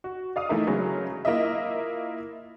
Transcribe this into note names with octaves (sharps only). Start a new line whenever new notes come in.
F#4
D5 F5 D#6
E3 A3 D#4 E4 A#4
C#3 F#3 G#3 C#4
A#3 E4 F4 D#5 E5